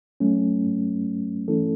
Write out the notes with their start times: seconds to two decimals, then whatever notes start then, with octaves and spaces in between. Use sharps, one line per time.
0.20 F#3 A3 C#4
1.48 E3 A3 C#4 E4 A4